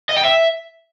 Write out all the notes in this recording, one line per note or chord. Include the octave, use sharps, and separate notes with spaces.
D#5
G5
E5